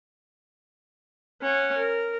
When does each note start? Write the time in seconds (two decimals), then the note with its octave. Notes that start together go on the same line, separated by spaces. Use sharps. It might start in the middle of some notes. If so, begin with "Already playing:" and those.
1.42 C#4 F#5
1.78 A#4